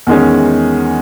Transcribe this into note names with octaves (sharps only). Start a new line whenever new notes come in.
E2 D#3 G#3 C#4